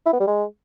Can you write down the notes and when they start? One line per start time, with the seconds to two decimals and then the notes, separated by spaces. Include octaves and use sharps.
0.06 E4
0.13 B3
0.20 G3
0.27 G#3